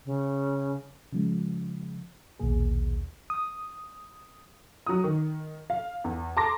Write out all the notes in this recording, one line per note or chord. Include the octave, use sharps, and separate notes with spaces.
C#3
C#3 F3 G#3
A#1 D#2 B2 A#3 G#4
D#6
F#3 D#6
D#3
F5
E2
A5 A#5 C6 D6 A#6